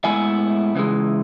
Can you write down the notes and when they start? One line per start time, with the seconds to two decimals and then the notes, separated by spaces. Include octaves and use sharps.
0.04 A2 G#3 B3 E4 E5 G#5
0.75 C#3 E3 G#3